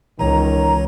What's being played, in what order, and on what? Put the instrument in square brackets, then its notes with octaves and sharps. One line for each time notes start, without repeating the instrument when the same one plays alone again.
[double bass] C#2 [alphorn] D#3 [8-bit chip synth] E3 C#5 [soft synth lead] A#5